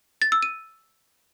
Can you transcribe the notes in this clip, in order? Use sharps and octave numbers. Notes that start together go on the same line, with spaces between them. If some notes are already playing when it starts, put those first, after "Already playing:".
A6
E6
D#7